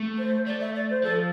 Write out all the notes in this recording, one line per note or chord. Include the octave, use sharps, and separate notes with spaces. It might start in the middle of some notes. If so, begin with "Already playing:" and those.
Already playing: A3
C5
A3 D5
E5
D5
C5
F3 A4